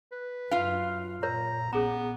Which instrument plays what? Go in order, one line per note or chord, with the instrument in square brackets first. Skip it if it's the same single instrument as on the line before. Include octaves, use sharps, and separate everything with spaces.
[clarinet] B4
[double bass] F#2 [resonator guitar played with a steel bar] F4 F5
[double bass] A#2 [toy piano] A#4 C#5 [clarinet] A#5
[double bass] A#1 [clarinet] B3 [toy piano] C#4 G#4 A#5